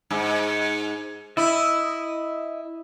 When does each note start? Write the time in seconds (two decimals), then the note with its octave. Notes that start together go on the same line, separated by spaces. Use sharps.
0.11 G#2
1.37 E4 D#5 E5